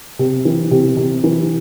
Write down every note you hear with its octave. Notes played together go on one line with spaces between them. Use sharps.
C3
E3
C3
C3
E3